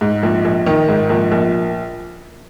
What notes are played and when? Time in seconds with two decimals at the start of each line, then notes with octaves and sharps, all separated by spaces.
0.01 G#2
0.23 A#1
0.45 A#1
0.66 D#3
0.89 G#2
1.10 A#1
1.32 A#1